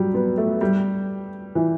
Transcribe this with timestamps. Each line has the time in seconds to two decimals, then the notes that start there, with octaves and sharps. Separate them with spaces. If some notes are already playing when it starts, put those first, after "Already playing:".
Already playing: F#3 G3
0.14 B3
0.38 A3
0.61 G3
1.55 E3